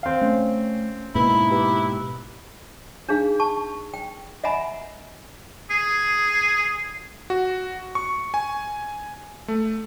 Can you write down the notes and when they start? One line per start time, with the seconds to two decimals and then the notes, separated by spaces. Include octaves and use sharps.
0.03 C4 F5
0.21 A3 C#4
1.15 G#2 B2 A#3 D#4 E4 B4
1.51 G4 B4
3.09 D4 D#4 G#4 F5
3.39 A5 C#6
3.94 G5
4.44 D#5 E5 F#5 G#5 A#5 B5
5.71 G#4
7.30 F#4
7.95 C#6
8.34 G#5
9.48 A3